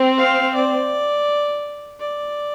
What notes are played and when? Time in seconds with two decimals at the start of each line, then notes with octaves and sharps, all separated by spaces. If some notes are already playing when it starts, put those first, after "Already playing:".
Already playing: C4
0.18 F5
0.55 D5
2.00 D5